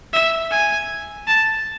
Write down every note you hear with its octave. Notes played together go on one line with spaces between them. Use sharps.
E5
G#5
A5